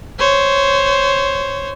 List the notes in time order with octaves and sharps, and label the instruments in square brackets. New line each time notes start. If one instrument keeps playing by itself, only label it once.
[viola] C5 C#5